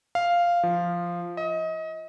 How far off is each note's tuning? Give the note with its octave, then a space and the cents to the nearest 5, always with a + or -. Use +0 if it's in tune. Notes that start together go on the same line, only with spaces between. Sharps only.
F5 -5
F3 -5
D#5 +30